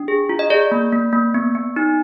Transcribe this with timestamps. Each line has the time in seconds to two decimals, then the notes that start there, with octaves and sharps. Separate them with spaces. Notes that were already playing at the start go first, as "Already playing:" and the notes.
Already playing: D4
0.08 G#4
0.29 F4
0.39 D#5
0.50 G#4 D5
0.72 A#3
0.93 A#3
1.13 A#3
1.34 B3
1.55 B3
1.76 D#4